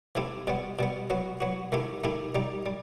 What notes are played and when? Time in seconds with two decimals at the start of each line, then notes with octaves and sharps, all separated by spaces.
0.15 E3 A3 C4 E4 G4
0.47 B2 G3 B3
0.79 B2 G3 B3
1.10 F#3 B3 F#4
1.41 F#3 B3 F#4
1.72 D#3 A3 E4 G4
2.04 D#3 A3 E4 G4
2.35 G3 D#4 G4
2.66 G3